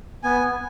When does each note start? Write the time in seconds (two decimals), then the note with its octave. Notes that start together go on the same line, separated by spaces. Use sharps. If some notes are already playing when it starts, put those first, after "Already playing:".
0.23 B3 G#5